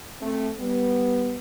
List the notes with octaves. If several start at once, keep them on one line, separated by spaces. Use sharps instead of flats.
A3 C4
G3 B3